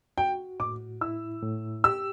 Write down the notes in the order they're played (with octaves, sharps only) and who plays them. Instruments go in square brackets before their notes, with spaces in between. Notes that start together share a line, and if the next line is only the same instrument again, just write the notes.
[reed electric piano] F#4 [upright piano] G5
[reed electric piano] A2 [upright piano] D6
[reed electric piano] E4 [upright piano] E6
[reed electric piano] A2
[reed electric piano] G4 [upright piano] E6